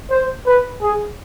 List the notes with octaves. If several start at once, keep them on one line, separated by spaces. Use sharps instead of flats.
C5
B4
G#4